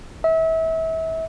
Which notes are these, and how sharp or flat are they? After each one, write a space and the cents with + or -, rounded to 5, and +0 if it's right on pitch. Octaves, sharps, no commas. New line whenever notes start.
E5 -30